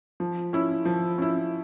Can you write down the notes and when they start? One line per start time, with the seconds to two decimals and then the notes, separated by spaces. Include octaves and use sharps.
0.20 F3
0.53 C#4 E4
0.85 F3
1.18 C#4 E4